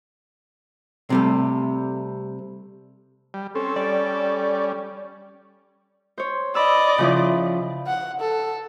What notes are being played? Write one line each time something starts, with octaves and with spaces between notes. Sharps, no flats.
C3 G3 A3
G3
C4 C#4 A4
G3 C#4 D5
C5 C#5
D5 D#5 B5 E6
C#3 F3 E4
F#5
A4